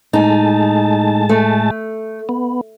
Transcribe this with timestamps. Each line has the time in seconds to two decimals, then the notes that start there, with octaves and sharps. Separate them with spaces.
0.13 A2 G#3 D#4 A5
1.29 A3
2.29 B3